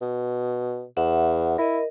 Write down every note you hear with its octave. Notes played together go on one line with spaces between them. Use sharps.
B2
E2 E5 F#5
E4 A#4 D#5